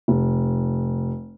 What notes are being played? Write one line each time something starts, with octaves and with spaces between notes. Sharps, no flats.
F1